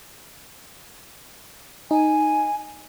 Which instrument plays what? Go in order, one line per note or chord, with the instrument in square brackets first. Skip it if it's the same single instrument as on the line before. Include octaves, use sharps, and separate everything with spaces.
[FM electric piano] D#4 [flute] G#5